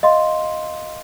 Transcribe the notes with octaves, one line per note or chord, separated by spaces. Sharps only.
D#5 F5 C6